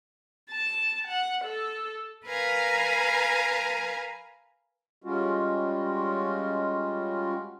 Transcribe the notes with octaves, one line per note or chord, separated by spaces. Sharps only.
A5
F#5
A4
A#4 B4 F5 G#5 A#5
G3 G#3 C#4 F4 F#4